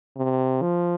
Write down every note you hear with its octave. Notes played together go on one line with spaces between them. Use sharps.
C3
F3